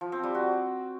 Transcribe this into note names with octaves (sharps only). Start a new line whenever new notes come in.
F3
C4
G3
F#4